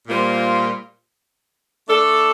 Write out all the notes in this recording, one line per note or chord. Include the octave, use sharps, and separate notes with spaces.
A#2 G3 A#3 F4 C5
A3 D4 A4 D5